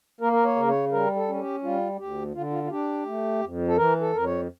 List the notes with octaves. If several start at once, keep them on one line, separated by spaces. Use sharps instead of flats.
A#3 A#4
A#4
C#5
C#3 A#4
C#5
G3 A#4
A4
C#4
A4
G4
G3 F4
D2 G4
D3 F4
F4
F4
D4 G4
A3
F2
A4
E3 A#4
A4
F2 A#4
C#5